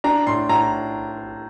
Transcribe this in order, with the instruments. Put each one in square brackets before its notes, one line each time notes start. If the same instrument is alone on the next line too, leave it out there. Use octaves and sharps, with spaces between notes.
[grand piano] D4 A#5
A2 C6
A2 A#5